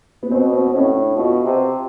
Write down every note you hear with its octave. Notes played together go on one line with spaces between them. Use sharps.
B3
B2 C4
C4
C4
A2 C#4
D4
B2 F4
C3